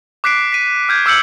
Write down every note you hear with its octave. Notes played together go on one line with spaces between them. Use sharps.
D6 F#6 B6 C7 D7
B6 D#7
F6 G6 G#6
D6 E6 F6 G6 C#7 F#7